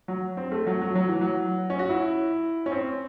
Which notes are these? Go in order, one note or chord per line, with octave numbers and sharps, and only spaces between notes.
F#3
C4
A3
F#3
F#3
F#3
E3
F#3
C#4
F#4
E4
C#4
C4